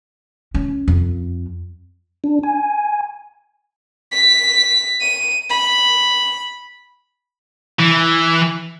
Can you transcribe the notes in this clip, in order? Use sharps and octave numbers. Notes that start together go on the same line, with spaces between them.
C#4
F2
D4
G#5
B6
D#7
B5
E3